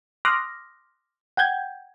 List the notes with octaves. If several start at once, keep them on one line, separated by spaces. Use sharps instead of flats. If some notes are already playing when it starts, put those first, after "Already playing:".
C6 D6 D#6 F6 F#6 A#6
F#5 G5 G6 G#6